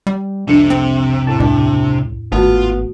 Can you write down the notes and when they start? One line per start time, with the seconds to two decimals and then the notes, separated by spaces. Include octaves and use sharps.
0.07 G3
0.48 C2 F2 C3 D4 C#7
0.70 C4
1.27 E2 A2 A5
1.40 C#2 D4
2.32 G#1 A3 B3 F4 F#4